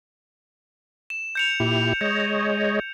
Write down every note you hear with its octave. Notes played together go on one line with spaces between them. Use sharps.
E7
G6 C#7 F7
A#2 E4 G4
G#3 C#5 D#5 G6